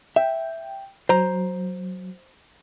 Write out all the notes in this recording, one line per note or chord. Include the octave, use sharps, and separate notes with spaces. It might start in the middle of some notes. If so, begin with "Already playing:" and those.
E5 G5
F#3 C5 A#5